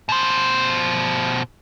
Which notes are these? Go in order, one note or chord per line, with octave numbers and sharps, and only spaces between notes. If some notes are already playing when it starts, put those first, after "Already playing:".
B2 C5